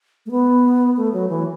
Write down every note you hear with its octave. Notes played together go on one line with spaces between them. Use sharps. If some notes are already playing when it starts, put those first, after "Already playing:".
A3
B3
A3
F#3
E3